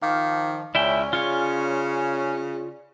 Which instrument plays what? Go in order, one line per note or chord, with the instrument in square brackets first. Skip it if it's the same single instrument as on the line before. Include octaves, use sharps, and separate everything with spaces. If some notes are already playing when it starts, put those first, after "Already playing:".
[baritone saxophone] D#3 [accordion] F3 [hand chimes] F5 D6 F6
[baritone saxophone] C#2 [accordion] C#4 [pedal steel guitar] E4 E5 G5 [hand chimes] D5 G#5
[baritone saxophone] C#3 [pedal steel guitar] F4 C#5